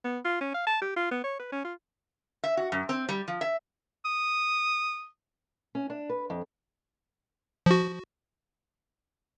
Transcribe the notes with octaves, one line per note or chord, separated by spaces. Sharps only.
B3
F4
C#4
F5
A5
G4
F4
B3
C#5
B4
C#4
F4
E5
F#4
F#2
C4
G3
F3
E5
D#6
C#4
D4
B4
F2
F3 F#4